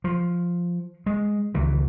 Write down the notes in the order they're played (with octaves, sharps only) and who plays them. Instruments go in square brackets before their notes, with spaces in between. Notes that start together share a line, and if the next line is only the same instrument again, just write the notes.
[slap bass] F3
G#3
C#2 D#3 E3